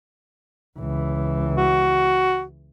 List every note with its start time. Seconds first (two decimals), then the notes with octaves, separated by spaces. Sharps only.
0.79 C#2 E3
1.57 F#4